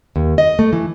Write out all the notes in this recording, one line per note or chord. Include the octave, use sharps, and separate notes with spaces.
D#2
D#5
A3
E3